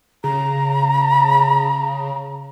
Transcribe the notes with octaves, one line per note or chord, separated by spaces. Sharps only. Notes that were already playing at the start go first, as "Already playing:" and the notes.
C#3 A#5